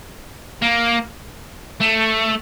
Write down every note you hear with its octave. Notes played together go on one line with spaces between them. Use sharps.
A#3
A3